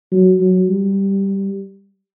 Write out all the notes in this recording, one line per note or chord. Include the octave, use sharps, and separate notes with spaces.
F#3
F#3
G3